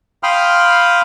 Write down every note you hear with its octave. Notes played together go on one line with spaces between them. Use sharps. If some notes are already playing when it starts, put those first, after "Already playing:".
F5 G5 B5 C6 D#6 F6